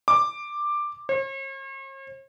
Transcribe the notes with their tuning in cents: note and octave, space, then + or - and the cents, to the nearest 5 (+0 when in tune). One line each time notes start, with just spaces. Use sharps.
D6 +10
C#5 -45